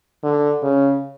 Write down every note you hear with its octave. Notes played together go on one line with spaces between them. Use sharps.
D3
C#3